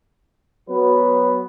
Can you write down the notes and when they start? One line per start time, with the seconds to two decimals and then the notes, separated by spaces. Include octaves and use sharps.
0.69 F#3 B3 F#4 B4